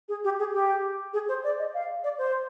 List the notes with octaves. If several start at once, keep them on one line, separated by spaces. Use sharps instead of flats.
G#4
G4
G#4
G4
G#4
C5
D5
D#5
F5
D5
C5